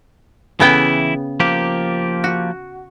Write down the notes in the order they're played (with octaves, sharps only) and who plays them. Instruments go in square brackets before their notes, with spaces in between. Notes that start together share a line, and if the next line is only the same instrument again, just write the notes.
[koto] C#3 B3 G5 [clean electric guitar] E3 E4
[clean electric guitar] F3 A#3 G4
[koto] F#4